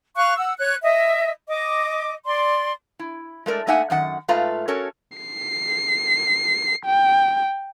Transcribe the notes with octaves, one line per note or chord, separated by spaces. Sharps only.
F5 C#6 F#6
F#5 E6
C#5 F#6
D#5 E5
D#5 D6
D5 C6
E4
G#3 A3 A#4 D5
A3 A#3 D#4 E5 F#5 G#5
F#2 D#3 F#5
G#2 A3 F4 B4 F5 A#5
C#4 F#4 A4 A#4 C#5
C7
G5